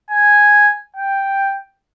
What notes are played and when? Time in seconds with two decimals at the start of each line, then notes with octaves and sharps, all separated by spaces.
0.11 G#5
0.96 G5